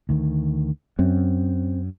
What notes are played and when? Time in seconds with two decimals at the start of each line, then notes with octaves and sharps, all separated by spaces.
0.09 D2 D#3
0.99 F#2 C4